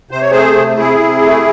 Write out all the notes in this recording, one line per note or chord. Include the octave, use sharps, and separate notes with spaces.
C3 C5
C#5
A3 G#4 C5
C3
C3 E4 G#4
C3
A3